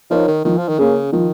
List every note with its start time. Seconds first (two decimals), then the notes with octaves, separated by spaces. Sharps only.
0.10 F3 D#4 A#4 C#5
0.28 D#3
0.45 D#3 F3
0.58 F3
0.68 D#3
0.79 C#3 A#3 C#4 G#4
1.12 D#3 F3